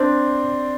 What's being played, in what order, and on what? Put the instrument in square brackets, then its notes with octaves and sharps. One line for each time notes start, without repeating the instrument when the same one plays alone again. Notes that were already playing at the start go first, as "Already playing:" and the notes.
Already playing: [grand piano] C4 D4